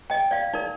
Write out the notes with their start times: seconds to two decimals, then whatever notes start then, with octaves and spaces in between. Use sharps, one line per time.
0.10 D#5 G5
0.31 D5 F5
0.53 D#4 A#4 D5